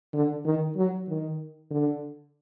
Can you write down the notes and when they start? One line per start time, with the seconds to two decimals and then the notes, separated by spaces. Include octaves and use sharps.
0.14 D3
0.45 D#3
0.77 F#3
1.08 D#3
1.71 D3